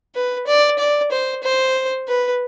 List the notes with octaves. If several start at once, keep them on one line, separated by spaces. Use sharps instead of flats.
B4
D5
D5
C5
C5
B4